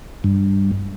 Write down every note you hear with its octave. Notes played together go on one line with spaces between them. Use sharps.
G2